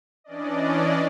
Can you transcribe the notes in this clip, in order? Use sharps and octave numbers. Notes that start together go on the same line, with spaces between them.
E3 C#4 D4 D5 D#5